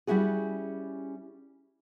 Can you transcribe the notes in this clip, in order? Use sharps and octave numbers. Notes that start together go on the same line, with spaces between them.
G3 C#4 E4 F#4 G#4